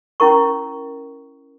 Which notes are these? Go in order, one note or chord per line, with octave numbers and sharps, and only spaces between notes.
C#4 E4 A#4 C#6